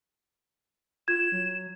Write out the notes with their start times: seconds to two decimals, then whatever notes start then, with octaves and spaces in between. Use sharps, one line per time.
1.08 F4 G#6 E7
1.32 F#3